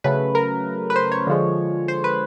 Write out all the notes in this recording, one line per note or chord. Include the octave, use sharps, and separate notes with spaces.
C#3 F#3 A3 B4
A#4
B4
C5
C#5
D3 F3 G#3
C5
B4